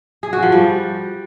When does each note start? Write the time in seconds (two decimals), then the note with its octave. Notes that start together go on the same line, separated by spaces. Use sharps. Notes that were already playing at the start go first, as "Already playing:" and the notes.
0.23 G#4
0.33 F#4
0.42 F3
0.52 G3